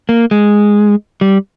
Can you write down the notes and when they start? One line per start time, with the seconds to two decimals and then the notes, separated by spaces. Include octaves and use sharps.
0.09 A#3
0.31 G#3
1.21 G3